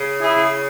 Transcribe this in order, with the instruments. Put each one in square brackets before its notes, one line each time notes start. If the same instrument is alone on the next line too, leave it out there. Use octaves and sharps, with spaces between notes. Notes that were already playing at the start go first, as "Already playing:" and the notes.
Already playing: [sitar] C#3
[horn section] E4 G#4
[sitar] C#3